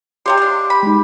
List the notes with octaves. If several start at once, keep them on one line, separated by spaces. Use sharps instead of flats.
C3 G4 C#5 F5 C6
G#3 D4
B5
G#3 D#4